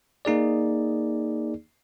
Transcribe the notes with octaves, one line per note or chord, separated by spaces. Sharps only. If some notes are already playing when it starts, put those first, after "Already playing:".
A#3 D#4 G#4 D5